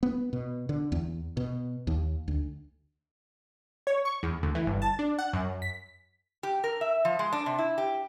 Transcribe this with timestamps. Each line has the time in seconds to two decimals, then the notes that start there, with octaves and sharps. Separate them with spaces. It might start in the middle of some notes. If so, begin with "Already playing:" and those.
0.03 B3
0.33 B2
0.69 D3
0.92 E2
1.37 B2
1.87 D#2
2.28 D2
3.87 C#5
4.05 C#6
4.23 E2
4.43 D2
4.55 E3
4.67 G1
4.82 A5
4.99 D4
5.19 F#5
5.33 F#2
5.62 B6
6.43 G4
6.64 A#4
6.81 E5
7.05 F3
7.19 G#3
7.33 D4
7.46 C3
7.59 E4
7.78 G4